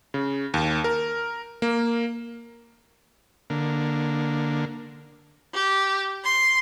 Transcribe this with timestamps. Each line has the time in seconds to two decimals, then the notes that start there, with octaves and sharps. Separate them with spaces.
0.14 C#3
0.54 D#2
0.84 A#4
1.62 A#3
3.50 D3 A#3
5.54 G4
6.24 C6